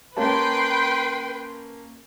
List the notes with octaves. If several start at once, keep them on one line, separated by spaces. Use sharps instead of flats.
A#3 C#4 B4 G5 A5 C6